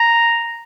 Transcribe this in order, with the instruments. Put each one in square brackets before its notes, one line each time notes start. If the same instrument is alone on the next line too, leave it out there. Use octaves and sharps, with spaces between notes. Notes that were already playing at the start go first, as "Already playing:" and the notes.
Already playing: [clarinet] A#5